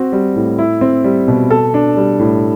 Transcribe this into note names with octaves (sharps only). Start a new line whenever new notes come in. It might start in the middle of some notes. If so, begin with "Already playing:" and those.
Already playing: C4 F#4
G3
A2
E4
C4
G3
B2
A4
D4
G3
A2